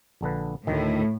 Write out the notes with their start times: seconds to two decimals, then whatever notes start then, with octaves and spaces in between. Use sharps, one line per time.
0.21 A#1 D3 B4
0.67 D2 A2 D#3